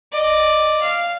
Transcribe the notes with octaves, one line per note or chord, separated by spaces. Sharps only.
D5 D#5
F5